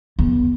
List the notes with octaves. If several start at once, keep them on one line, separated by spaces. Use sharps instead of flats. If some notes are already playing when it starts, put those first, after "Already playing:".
E2